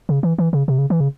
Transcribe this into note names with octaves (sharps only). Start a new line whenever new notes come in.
C#3
E3
E3
C#3
C3
C#3
E3
C#3